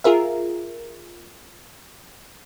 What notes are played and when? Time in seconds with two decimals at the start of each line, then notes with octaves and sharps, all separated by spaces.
0.04 F4 G#4 A#4 E5